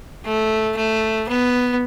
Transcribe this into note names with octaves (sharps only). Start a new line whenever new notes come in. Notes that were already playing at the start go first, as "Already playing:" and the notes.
A3
A3
B3